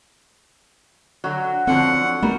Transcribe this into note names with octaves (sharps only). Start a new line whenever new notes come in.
D3 F#3 F#4
D3 F3 F#3 C4 F#5
G3 A3 B3 A#4